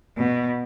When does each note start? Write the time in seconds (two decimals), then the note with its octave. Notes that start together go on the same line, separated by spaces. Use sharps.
0.17 B2